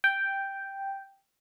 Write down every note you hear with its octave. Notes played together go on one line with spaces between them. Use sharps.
G5